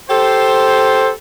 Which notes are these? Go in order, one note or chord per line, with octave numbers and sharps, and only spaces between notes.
G4 A4 C5